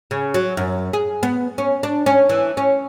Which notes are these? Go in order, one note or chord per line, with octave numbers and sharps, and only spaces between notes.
C#3
F#3
F#2
G#4
B3
C#4
D4
C#4
E3
C#4